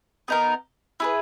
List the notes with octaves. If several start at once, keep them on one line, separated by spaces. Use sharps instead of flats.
B3 D#4 A#4
E4 G#4 B4